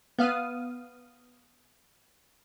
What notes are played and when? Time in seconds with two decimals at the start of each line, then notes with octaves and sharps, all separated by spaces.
0.18 B3 F5 D#6